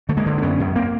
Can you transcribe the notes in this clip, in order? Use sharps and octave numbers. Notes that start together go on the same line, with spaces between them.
D3 A3
G#3 A#3
D3
D4
F#2 B3 C#4
F#2
A#3 C4